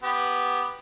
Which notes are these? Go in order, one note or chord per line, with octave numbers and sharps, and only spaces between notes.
B3 G4